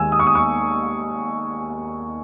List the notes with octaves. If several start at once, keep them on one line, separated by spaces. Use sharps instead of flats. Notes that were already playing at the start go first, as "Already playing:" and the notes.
Already playing: D#2 D#3 G#3 G#5 E6
D#6
C#6
D#6
C#6